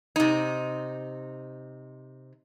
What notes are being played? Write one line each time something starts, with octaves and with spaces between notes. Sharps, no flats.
C3 D#4